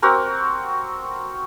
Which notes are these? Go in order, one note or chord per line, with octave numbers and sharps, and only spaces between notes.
C4 F#4 A#4